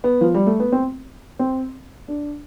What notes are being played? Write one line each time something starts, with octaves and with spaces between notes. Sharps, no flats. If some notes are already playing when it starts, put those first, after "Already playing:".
B3
F3
G3
A3
B3
C4
C4
D4